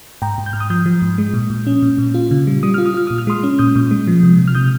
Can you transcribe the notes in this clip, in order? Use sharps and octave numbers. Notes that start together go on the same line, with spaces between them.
G#2 G5 A#5
G#2
G6
G#2 F6
D#6 G6
F3 D#6 G6
F3
G#2
G#3
A#2
A#2
C#4
A#2
A#2
F4
C#3
G3
G3 D#6
F4 F6
D#6
F4 F6
A#2 D#6
F6
G#3 C6 D#6
C#4
A#2 D#6 G6
A#2
G#3
F3
C3
C3
F6
C3 D#6 G6